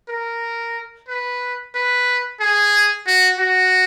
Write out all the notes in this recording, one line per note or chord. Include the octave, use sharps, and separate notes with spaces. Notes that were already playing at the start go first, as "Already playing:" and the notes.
A#4
B4
B4
G#4
F#4
F#4